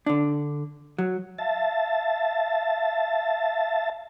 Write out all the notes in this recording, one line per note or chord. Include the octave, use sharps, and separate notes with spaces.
D3 D4
F#3
E5 F5 A5 A6